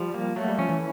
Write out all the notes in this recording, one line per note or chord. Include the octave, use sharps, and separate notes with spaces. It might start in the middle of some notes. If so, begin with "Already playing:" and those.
Already playing: F3 G3
A#3
F#3 A3
G3
F3 C#4
E3